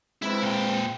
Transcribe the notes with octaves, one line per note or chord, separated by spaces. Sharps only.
G#3 C4 E4 B4
A#2 G5